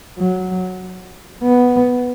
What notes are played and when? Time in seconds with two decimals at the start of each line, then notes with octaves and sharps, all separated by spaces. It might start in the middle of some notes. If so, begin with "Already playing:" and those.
0.18 F#3
1.43 B3